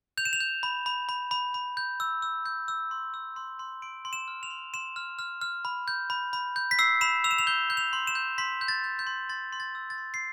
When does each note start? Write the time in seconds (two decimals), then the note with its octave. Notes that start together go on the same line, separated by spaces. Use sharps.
0.18 G6 F7
0.25 E7
0.33 F7
0.40 G6
0.63 B5
0.86 B5
1.09 B5
1.31 B5
1.54 B5
1.77 G6
2.00 E6
2.22 E6
2.46 G6
2.68 E6
2.91 C6
3.14 E6
3.36 C6
3.59 C6
3.82 C6 D7
4.05 C6
4.13 E7
4.28 F6
4.43 F7
4.50 C6
4.74 C6 E7
4.96 F6
5.19 F6
5.41 F6
5.65 B5
5.88 G6
6.10 B5
6.33 B5
6.56 G6
6.71 B6
6.79 E6 C7
7.01 B5 E7
7.24 E6 F7
7.31 E7
7.38 F7
7.47 G6 G7
7.70 G6
7.77 F7
7.93 C6
8.07 E7
8.15 G6
8.38 C6 B6
8.61 G6
8.68 A6
8.84 G6
8.99 G6
9.07 C6
9.29 C6 A6
9.53 C6
9.60 A6
9.75 E6
9.90 A6
9.98 C6
10.14 C7